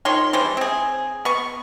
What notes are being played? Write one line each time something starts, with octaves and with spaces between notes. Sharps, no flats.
D#3 F3 C#5 C6
E3 G3 G#3 C5
C4 G#4
B3 C#6